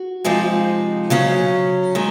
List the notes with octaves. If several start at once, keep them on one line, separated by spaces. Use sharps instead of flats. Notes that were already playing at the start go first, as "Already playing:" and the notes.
Already playing: F#4
C3 F3 G#3 C4 D#4
C#3 F#3 C#4
D#3 G#3